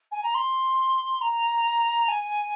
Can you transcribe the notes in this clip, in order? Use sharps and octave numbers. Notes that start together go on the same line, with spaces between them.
G#5
A#5
C6
A#5
G#5